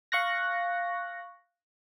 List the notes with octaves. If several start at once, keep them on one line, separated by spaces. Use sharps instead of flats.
F5 C#6 F#6 A#6